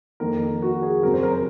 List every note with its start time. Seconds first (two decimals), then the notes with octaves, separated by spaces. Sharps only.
0.20 F2 D#3 A#3 A#4
0.62 F#4
0.82 G#4
1.03 F#2 C#3 F#3 C4 A#4
1.13 C5
1.23 A#4
1.33 A#4